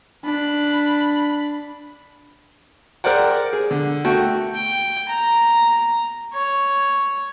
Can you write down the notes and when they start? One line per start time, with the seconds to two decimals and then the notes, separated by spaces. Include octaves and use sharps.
0.24 D4 B5
3.04 G#4 A#4 C5 D5 F#5 G5
3.53 G#4
3.71 D3
4.05 A3 F#4 G5
4.55 G5
5.09 A#5
6.33 C#5